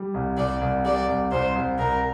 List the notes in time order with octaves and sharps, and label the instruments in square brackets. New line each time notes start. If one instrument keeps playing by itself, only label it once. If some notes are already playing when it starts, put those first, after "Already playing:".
Already playing: [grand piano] G3
C2
[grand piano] C2 [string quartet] D5
[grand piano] C2
[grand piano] G3 [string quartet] D5
[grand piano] C2
[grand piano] C2 [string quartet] C5
[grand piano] C2
[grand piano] C2 [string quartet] A#4